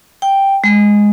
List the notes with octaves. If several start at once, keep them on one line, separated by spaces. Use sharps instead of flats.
G5
G#3